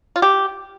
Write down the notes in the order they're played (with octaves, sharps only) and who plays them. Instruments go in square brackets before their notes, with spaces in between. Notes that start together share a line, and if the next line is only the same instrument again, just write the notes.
[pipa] F4
G4